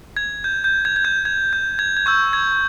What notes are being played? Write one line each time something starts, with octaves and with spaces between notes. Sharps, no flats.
G#6
G6
G6
G#6
G#6
G6
G#6
G6
G#6
G#6
C#6 E6 G6
G#6